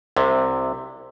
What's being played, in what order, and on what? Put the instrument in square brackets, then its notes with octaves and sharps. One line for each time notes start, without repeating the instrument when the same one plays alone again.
[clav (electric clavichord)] C2 C3